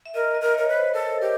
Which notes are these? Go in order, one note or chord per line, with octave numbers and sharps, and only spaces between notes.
E5
A#4 D#5
D#5
A#4
A#4 C#5
B4
C5
A4 A#4
G4 A#4